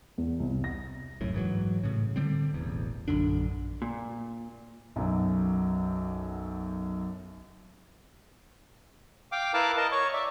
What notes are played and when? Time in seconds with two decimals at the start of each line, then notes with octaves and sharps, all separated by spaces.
0.18 E2
0.40 C2
0.64 A#6
1.21 F1 C2 F#2 A2
1.34 G#2 E3 F#3
1.84 A2 C#3
2.16 D3 G3 C4
2.54 E1 A1 E2
3.08 A#1 F#2 D3 D4
3.82 A#2
4.96 B1 F#2
9.32 F5 G5 D6
9.54 E4 A#4 B4 F5 A5 D6
9.77 A#4 D#5 A5
9.92 C#5 C#6
10.13 D5 E5